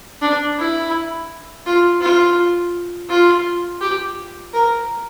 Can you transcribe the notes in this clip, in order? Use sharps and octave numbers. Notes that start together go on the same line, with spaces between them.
D4
E4
F4
F4
F4
G4
A#4